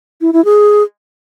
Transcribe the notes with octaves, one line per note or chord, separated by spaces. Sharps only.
E4
E4
G#4